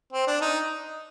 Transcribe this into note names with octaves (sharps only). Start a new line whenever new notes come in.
C4
D4
D#4